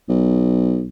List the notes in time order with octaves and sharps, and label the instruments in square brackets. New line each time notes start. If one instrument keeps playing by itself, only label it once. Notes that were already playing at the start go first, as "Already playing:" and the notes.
[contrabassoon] B1